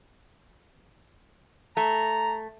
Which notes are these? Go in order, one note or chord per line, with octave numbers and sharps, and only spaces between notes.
A3 A#5